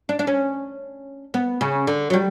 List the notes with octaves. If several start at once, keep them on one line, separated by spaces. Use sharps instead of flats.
D4
D4
C#4
B3
C#3
D3
F#3
G3